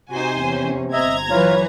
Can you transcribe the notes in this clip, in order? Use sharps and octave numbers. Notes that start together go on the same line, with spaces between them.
C3 D#4 F#4 C5 G#5
E2 C#4
G1 C4 D#5 E5 A#5 G#6
E3 F#3 F4 B4 C#5